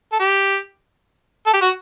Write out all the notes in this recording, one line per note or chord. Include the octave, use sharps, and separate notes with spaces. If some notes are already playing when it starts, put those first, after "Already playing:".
A4
G4
A4
G4
F#4